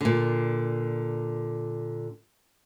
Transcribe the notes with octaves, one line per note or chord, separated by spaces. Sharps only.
A#2 D3